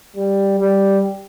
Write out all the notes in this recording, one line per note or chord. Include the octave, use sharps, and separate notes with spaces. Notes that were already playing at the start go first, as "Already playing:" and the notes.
G3
G3